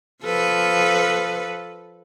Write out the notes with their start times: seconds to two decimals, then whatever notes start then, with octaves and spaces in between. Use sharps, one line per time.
0.24 F3 A4 B4